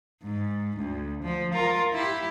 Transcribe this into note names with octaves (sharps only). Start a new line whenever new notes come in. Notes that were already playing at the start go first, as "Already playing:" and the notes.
G#2
D2
F3
F4 A#4
E4 G4